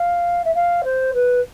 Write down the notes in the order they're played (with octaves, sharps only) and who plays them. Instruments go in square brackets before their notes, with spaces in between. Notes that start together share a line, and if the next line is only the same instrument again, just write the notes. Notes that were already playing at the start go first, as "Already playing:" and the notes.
Already playing: [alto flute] F5
E5
F5
C5
B4